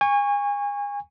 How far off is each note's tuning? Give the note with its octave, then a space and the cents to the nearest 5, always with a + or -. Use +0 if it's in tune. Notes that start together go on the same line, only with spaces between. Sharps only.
G#5 -30 C#6 +0